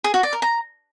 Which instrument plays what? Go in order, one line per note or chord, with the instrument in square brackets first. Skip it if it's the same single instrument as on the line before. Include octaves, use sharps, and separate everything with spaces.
[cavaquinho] G#4
F#4
D5
A#4
A#5